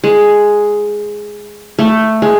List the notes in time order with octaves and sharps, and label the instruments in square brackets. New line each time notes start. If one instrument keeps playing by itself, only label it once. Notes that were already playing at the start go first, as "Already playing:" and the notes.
[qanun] G#3
A3
G#3